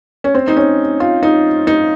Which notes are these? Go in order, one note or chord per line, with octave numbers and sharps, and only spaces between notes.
C#4
C4
D#4
C#4
F4
D#4
D#4